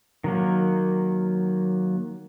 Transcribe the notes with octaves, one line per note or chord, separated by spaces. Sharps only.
D#3 F#3 A#3